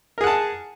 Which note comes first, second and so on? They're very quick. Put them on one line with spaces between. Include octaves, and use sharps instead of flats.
A#4 G#4 F#5 A5